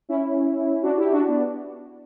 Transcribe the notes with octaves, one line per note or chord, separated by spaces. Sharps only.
C#4 E4
D4 F#4
E4 G4
D4 F#4
B3 D4